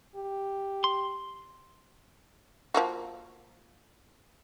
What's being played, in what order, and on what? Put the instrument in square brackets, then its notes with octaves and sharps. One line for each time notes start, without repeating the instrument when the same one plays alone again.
[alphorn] G4
[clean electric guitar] C6
[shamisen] F3 A#3 F#4